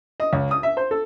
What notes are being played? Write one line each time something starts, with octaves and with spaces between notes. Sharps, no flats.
D#5
C#2
D#6
E5
C5
A4